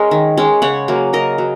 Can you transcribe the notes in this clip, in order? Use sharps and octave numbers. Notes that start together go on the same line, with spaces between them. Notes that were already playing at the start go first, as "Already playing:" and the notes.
Already playing: G#3 C#4 A#4 D#5
D#3
G#3 C#4
C#3 C#5 F#5
F#3 A#3
C#3 A#4 D#5
F#3